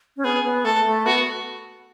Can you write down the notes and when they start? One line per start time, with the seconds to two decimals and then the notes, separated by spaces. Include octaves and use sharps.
0.17 C#4
0.24 B3 G#4
0.44 B3
0.65 A3 A4
0.85 A3
1.06 B3 F#4